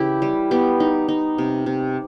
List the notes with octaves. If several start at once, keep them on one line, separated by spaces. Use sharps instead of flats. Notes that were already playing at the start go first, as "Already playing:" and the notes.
Already playing: C#3 E3 E4 G4
G3
B3 G4
D#4
D#4
C3
C3